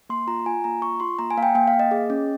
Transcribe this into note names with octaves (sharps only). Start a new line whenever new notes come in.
A#3 C6
F4 A#5
F4 G#5
A#3 A#5
F4 C#6
F4 C6
A#3 A#5
G#5
A#3 F5
G5
A#3 G5
F5
A#3
D#5
G#4
C#4